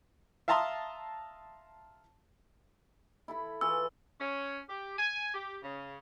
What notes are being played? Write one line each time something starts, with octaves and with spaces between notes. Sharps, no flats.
E5 F5 A5 A#5 C6 D#6
E4 A4 B5
E3 F4 G#4 E6
C#4
G4
G#5
G4
C#3